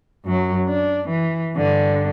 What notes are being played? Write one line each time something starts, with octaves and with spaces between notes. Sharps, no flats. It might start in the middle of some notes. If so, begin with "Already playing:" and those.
F#2 F#3
D4
E3
G2 D3